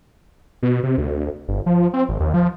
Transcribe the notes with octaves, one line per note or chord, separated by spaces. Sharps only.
B2
C3
D2
G1
F3
C4
G#1
D#2
F3